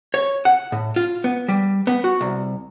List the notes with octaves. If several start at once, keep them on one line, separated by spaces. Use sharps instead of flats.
C#5
F#5
A2
F4
B3
G3
B3
F#4
C2